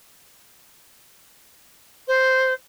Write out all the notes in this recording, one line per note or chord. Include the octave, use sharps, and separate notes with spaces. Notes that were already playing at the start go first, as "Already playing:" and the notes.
C5